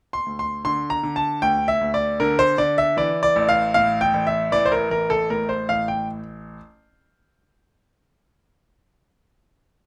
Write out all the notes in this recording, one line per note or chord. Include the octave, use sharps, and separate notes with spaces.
C6
D2
C6
D3 C6
A#5
D3
A5
D2 G5
E5
D2
D5
D3 A#4
C5
D3 D5
E5
E3 D5
D5
A1
F5
A2 F5
G5
A1
E5
E3 D5
C5
A#4
A1 A#4
A4
A2 A#4
C5
A1 F5
G5